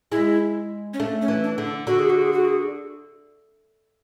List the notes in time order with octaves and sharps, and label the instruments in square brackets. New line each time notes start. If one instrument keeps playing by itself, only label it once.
[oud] G#3 [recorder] E4
[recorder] C#4
[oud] A3 [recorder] D4
[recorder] C#4
[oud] E3
[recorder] D4
[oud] D3
[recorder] D4
[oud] D3 [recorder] F#4
[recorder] G#4
F#4
G#4
F#4
G#4